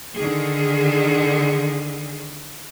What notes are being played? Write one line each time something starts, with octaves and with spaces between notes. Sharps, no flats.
D3 D#3 G#4